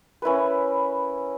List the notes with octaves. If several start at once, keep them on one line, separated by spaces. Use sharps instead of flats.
C#4 E4 A#4 B4